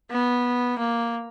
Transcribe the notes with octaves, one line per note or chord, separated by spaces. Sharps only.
B3
A#3